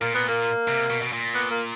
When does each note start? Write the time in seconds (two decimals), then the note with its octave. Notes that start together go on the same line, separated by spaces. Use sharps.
0.01 A#2 A#3
0.14 B3
0.28 A#3
0.68 C3
0.90 B2
1.02 B2
1.13 A#2
1.35 B3
1.51 A#3